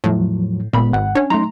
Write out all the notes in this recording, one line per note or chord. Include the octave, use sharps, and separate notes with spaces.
E2 A2 F3 F#3
G1 A#2 G#3 B3 B5
G#1 F#5
C#4 D4 C#5
F#3 A3 D#4 A#5 C6